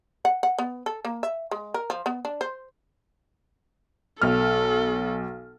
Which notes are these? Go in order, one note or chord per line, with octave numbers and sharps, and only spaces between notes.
F#5
F#5
B3
A4
A#3
E5
G#3
A#4
F3
B3
D4
C5
B1 A4 F6